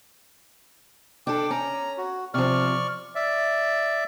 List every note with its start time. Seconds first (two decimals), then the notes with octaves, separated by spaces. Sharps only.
1.27 D4 A4 G5 D6
1.51 C#4 A#5
1.98 F#4
2.34 C3 F3 D5 C#6 F6
3.15 D5 E5